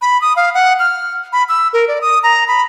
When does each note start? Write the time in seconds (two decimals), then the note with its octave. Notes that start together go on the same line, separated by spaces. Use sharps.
0.02 B5
0.22 D#6
0.36 F5
0.54 F#5
0.79 F6
1.33 B5
1.49 E6
1.73 A#4
1.88 D5
2.01 D#6
2.23 A#5
2.48 B5